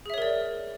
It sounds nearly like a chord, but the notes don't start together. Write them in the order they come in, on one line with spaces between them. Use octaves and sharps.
G#4 E5 C#5 A#4 D5